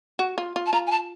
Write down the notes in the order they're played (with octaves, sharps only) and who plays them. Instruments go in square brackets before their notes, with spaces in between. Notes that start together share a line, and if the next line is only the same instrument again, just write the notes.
[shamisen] F#4
F4
F4
[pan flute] A5
[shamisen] F4 [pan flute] A#5
[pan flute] G#5
A5